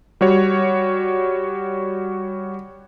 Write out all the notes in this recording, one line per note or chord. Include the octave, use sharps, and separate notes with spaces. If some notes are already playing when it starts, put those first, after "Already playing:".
G3 F#4 C#5